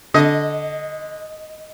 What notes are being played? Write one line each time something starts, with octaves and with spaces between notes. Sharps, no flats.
D3 D#5